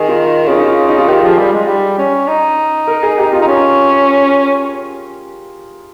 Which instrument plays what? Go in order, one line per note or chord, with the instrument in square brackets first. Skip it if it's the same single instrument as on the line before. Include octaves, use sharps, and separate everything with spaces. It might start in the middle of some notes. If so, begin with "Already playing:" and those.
Already playing: [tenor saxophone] D#3 [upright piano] G#4 A#4
[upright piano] F4
[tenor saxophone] C#3 [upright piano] F4
[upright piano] D#4
F4
D#4
F4
[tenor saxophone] D#3 [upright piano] G4
[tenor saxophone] F3 [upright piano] G#4
[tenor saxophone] G3
G#3
G3
C#4
D#4
[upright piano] A#4
G#4
G4
F4
[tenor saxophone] D#4
C#4